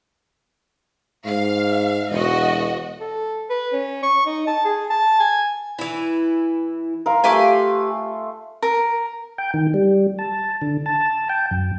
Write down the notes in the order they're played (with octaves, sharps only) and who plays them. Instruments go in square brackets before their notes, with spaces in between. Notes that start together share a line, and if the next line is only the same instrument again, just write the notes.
[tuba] G#2 [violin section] F5
[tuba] E1 [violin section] F#4 D#5
[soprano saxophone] A4
B4
C#4
C#6
D#4
A5
G#4
A5
G#5
[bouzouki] E3 E4
[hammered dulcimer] A#4 F5 C6
[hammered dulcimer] A3 F4 [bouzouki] G4 B4 G#5
[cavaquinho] A#4
[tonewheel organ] G5
D#3
G3
A5
D3
A5
G5
F#2